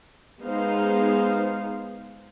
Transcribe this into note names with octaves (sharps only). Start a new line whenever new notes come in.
G#3 B3 D#4 C5 F5